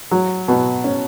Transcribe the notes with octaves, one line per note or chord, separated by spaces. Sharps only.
F#3
B2
C#4